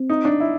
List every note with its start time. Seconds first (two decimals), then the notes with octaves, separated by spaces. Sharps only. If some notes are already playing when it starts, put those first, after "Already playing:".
Already playing: C4
0.10 D#4
0.25 D4
0.40 E4